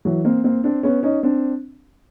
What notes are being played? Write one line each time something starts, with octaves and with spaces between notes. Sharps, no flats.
E3 F#3
A#3 C4
A#3 C4
C4 D4
B3 C#4
C#4 D#4
C4 D4